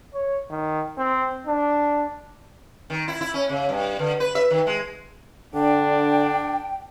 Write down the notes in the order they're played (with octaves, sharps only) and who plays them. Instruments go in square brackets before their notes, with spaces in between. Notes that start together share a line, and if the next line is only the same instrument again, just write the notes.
[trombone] C#5
D#3
C4
D4
[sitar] D#3
E4
E4
C#4
C#3
G2
D3
B4
E5
D#3
G#3
[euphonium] D3 [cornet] D4 [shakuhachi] G5